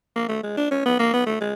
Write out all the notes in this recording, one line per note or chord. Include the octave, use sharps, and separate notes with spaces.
A#3
A3
G#3
D4
C#4
B3
A#3
B3
A3
G#3